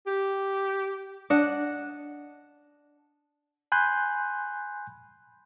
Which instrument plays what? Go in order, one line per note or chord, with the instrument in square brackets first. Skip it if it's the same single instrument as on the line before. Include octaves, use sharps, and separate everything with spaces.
[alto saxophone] G4
[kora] D4 D#5 F#5
[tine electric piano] G#5 B5 C6 F#6 G6